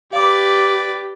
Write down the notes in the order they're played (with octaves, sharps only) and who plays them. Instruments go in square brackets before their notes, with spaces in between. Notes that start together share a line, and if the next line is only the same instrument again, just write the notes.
[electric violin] G4 [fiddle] B4 D5 [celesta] F5 D6